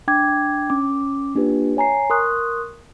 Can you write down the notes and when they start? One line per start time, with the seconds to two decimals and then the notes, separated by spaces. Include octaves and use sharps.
0.08 D4 G5 D6 G#6
0.70 C#4 D6
1.35 A#3 D4 F4 G4 B4
1.77 C#5 G#5 A#5 C7
2.10 A#4 C6 C#6 D#6 F#6